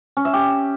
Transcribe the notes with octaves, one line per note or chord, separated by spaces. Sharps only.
C#4
E5
G4